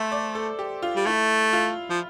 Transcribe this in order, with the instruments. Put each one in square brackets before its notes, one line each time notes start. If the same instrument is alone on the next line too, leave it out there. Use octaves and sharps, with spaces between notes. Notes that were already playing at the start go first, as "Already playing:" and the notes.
Already playing: [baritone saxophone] A3 [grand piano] C5 E5
[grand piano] D5
A4
G4
F4
[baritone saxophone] G3
[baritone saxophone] A3 [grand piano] E4
[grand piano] F4
[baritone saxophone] F3